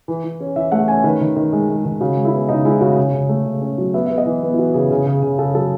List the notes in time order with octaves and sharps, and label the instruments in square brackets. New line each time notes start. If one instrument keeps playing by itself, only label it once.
[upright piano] E3
E3
C#4
E3 E5
A3 F#5
C#4 G#5
D#3 B4
D#3
D#3
G#3
G#3
D#3
C#3 F#4
G#3
E4
B3
C#3 D#4
G#3 E4
C#3 F#4
C#3
C#3
A3
C#3
C#4
F#3
B3 E5
B3 E5
D#5
E3
B3
E4
E3 F#4
C#3 G#4
C#3
C#3
C#3
C#3 A4
F#3 A4